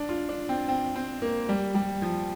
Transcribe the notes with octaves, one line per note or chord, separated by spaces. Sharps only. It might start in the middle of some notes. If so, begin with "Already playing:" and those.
Already playing: D4
F4
D4
C4
C4
C4
A#3
G3
G3
F3